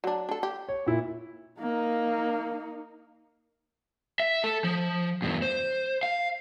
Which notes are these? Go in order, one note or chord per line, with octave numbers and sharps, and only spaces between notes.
F#3 D4
D4 A4
G4
C#5
A#2 E4
A#3 D#4
E5
A4
F3
E2 G2
C5
F5